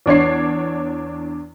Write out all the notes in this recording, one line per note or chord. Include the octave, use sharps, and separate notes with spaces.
E2 D4 C#5 C7